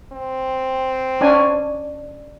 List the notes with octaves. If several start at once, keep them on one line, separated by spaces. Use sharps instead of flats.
C4
C#4 D4 G#5